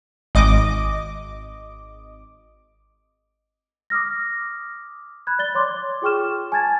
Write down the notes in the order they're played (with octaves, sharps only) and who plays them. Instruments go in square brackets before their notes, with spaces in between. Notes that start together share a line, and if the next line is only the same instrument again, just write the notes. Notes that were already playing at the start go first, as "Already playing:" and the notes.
[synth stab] G#1 D#5 D6
[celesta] D6 D#6 F6 A#6
B5 F#6 G#6
D5 A6 G7
C#5 C6 D6
F4 G#4 G5 C#6 F6 E7
G#5 A5 G#6 A6